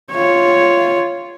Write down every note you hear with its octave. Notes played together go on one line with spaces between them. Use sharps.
F4 C#5